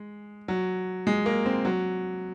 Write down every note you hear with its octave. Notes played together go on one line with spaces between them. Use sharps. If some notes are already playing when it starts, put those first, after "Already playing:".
Already playing: G#3
F#3
G#3
A#3
C4
F#3